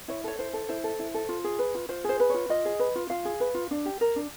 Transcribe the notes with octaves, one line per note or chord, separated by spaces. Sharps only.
E4 C#5
A4 C#5
E4 C5
A4
E4 C5
A4
E4
A4
F4
G#4
B4
F4
F4 C5
G#4 C5
B4
F4 C#5
F4 D#5
G#4
B4
F4
F4 F5
G#4
B4
F4
D4
G4
A#4
D4